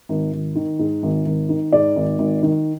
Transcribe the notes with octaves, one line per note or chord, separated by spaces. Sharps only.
G#1
G#1
D#3
G#2
G#1
G#1
D#3
G#2 D5
G#1
G#1
D#3